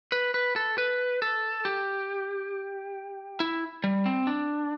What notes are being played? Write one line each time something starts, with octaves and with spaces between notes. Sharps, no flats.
B4
B4
A4
B4
A4
G4
E4
G3
C4
D4